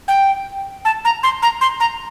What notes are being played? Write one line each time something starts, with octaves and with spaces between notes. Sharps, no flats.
G5
A5
A#5
C6
A#5
C6
A#5